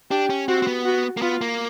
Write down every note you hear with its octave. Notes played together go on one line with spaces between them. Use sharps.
D4 G4
C#4
C4 F#4
C4
B3
F#4
A#3
B3 F4
A#3